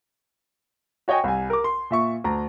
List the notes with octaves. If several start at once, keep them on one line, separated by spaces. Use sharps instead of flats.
F#4 C#5 D#5 G5 G#5
C2 G#5
A#4 D6
C6
A#2 E5 C#6
D2 A#5